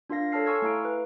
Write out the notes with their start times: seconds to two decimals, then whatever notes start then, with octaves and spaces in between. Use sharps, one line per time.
0.10 D4 F4 A#4 F5 A#6
0.32 A4 C#5 A5 F6 C7
0.46 G#5 C6 C#6 E6 F6 G#6
0.62 A3 E4 F5 A#5 D7
0.85 B4